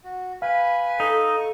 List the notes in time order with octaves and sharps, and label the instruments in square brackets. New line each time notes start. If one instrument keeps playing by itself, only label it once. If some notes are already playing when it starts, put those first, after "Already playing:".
[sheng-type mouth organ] F#4
[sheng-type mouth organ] B4 G#5 B5 [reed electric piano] F5
[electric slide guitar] D#4 [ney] A4
[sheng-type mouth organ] C#6